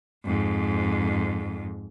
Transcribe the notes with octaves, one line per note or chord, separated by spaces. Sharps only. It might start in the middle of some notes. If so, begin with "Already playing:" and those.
F2 G#2